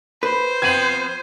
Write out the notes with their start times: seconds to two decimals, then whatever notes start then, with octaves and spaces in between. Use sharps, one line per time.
0.23 B4 C5
0.62 F3 B3 C4 G#6 D#7 F#7